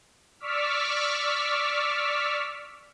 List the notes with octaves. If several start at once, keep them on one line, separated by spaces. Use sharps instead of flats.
D5 C#6 D6 E6 F6 B6